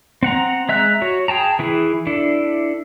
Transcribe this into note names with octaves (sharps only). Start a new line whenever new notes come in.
C4 F#5 A#5
G#3 E5 A#5 F#6
F#4 C#5
G#4 G5 A5 A#5
E3 E4 G#4
D4 E4 A4